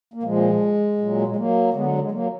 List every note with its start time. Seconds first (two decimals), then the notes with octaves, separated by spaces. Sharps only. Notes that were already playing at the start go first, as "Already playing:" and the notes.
0.14 A#3
0.23 A#2 F3 G#3
0.98 A#2 F#3
1.27 G#3
1.36 F#3 A#3
1.73 D3 F#3 G#3 B3
1.86 G#3
1.99 G#3
2.11 F#3 A#3